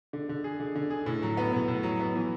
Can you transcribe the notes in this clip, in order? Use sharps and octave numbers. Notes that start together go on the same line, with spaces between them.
D3
D3
G#4
D3
D3
G#4
A2
F#3
B3
A2
A2
F#3
B3
E3